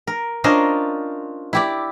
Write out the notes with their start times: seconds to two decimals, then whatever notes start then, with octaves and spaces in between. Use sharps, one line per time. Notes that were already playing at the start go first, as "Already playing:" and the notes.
0.07 A#4
0.44 C#4 D4 F4 A#4 C5 D#5
1.53 E4 G4 D5